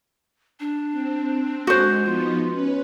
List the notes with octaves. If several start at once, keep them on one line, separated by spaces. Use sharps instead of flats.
D4
C4
G#3 F#4 C5
F3 B3 D#4 F4
C#4 B4